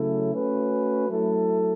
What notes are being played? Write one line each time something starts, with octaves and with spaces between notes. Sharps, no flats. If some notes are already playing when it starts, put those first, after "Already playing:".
Already playing: C#3 F#3 A3 E4 A4
A3 C#4 F#4 B4
F#3 A3 E4 A4